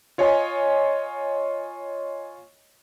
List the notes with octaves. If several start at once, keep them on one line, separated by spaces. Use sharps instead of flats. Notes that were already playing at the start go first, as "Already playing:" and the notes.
F4 C#5 D#5 G#5